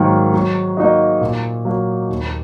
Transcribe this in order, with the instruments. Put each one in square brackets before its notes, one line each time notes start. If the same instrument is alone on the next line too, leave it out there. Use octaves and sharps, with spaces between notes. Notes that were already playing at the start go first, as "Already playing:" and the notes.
Already playing: [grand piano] G#2 D#3 F#3 A#3
F#3
A#3 D#4 F#4 D#5
A#2
F#3 A#3
D#2